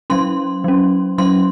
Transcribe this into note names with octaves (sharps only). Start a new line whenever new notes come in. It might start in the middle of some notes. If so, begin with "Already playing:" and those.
F#3 C#4 C6
F#3 C#4
F#3 C#4 C6